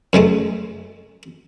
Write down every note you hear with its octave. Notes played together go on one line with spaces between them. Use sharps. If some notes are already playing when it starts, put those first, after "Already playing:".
F#2 C#3 G#3 A3